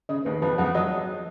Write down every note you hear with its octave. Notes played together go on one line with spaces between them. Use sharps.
C#3 D#5
D#2 D#3 B4
F2 F3 B4
F2 F3 F#5
F#3 D#5